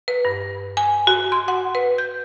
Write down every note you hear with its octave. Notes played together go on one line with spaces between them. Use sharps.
B4
G2
G#5
F#4
C6
F#5
B4
G6